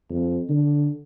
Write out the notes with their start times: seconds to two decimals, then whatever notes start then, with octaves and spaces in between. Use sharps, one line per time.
0.10 F2
0.49 D3